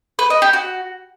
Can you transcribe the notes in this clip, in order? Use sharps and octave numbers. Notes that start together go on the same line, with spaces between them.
B4
D#5
G4
F#4